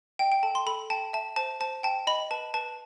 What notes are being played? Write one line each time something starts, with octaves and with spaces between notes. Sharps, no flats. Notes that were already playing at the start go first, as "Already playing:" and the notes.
D#5 G5
G5
A4 A5
C6
A4 B5
G5 A5
E5 A5
C5 A5
C5 A5
G5 A5
D#5 B5
B4 A5
B4 A5